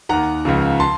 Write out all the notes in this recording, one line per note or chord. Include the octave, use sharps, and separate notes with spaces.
D#2 D#3 F#5 A#5
C#2 C#3 F3
A5 C6